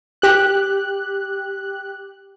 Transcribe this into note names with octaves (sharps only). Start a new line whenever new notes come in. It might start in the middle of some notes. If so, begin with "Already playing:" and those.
G4 F#6